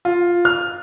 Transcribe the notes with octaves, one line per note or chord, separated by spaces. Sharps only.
F4
F6